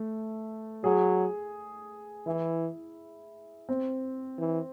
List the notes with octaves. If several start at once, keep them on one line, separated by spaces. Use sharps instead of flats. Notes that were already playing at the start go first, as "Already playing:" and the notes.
Already playing: A3
F#3 G#4
E3 E4
C4
E3